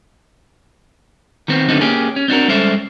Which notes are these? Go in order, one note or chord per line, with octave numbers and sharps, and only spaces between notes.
D#3 B3 C4
D3 F#3 A3 B3 C4 D#4
A#3 C#4 G4 G#4
C#4
C4 D4 F#4 A#4
G3 G#3 C#4 A4 C5 E5